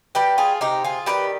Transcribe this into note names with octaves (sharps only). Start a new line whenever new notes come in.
G3 G4 B4
F4 G#4
C3 D#4 G4
F4 G#4
D#3 G3 G4 B4